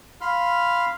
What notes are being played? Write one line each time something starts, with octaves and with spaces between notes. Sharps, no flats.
F5 B5 C6 F6